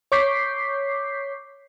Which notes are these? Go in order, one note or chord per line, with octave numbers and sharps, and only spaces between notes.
C#5 C#6 D6 G6 B6 C7